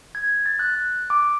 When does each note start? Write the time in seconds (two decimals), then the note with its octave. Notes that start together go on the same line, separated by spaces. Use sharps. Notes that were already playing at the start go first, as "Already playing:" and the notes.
0.15 G#6
0.46 A6
0.59 F#6
1.10 D6